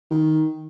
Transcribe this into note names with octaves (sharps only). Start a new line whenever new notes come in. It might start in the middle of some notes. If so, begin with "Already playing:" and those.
D#3